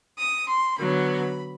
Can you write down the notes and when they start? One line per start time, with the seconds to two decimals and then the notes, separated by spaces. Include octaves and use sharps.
0.17 D#6
0.47 C6
0.78 D3 F#3 B3 B5